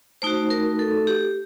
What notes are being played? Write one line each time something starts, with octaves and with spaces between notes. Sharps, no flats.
A3 D#4 F#4 C5
A#4
A4
G4